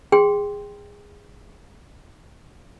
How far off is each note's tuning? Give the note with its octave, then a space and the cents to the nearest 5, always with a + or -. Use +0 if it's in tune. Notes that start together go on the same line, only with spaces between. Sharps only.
G#4 -15 G5 +0 C6 +0